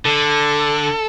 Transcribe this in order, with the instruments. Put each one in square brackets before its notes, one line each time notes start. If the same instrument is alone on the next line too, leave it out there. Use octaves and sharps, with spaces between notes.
[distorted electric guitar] D3 [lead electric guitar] A4